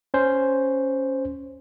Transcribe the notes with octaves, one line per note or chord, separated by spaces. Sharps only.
C#4 C5